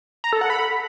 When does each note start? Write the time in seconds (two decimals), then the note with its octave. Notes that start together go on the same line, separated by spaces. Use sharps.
0.24 A#5
0.33 A4
0.41 F#5
0.50 B5